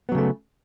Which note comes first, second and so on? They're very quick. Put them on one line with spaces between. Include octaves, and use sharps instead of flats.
B3 F#3 C#3 A3